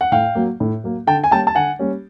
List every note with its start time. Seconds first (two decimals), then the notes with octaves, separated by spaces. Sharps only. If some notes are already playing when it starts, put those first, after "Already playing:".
0.01 F#5
0.12 A2 F5 G5
0.35 F#3 A#3
0.60 A2
0.84 F#3 A#3
1.07 D3 G5 A5
1.24 G#5
1.31 G3 A#3 C#4 G5 A5
1.47 A5
1.55 D3 F#5 G#5
1.79 G3 A#3 C#4